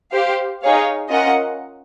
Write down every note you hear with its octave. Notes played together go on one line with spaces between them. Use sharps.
G4 C5 F5
D#4 G#4 C#5 F5
C#4 F4 A#4 D#5 F#5